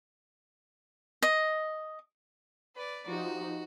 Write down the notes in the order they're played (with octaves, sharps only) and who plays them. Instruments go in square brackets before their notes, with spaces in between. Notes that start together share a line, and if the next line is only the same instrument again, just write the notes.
[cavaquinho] D#5
[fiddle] B4 D5
[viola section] F3 D#4 G4 [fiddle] F#4